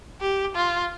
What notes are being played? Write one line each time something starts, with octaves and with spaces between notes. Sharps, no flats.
G4
F4